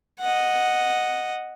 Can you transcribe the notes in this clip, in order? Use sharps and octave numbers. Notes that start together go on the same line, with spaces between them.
D#5 F#5